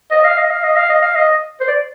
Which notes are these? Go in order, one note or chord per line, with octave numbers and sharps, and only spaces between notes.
D#5
F5
D#5
F5
D#5
F5
D#5
F5
D#5
C5
D5